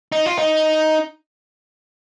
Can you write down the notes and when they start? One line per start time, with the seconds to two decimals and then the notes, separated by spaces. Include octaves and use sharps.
0.12 D#4
0.26 F4
0.38 D#4